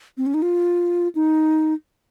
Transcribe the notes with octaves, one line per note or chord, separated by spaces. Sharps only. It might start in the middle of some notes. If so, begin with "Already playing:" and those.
C4
C#4
D#4
F4
D#4